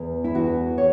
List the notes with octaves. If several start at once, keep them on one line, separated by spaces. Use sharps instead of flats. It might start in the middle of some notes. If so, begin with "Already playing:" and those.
Already playing: E2
E4
E2 F#4
C#5